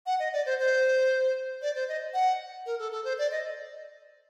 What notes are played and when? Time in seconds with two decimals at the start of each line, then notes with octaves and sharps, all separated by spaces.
0.06 F#5
0.19 D#5
0.33 D5
0.46 C5
0.59 C5
1.62 D5
1.75 C5
1.88 D#5
2.14 F#5
2.66 A#4
2.79 A4
2.92 A4
3.04 C5
3.18 D5
3.31 D#5